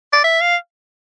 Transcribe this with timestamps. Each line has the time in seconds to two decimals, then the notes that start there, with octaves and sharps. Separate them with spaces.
0.13 D5
0.24 E5
0.40 F5